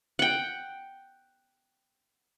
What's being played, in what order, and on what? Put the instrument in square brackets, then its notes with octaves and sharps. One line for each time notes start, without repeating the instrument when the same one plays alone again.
[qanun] F#5 G5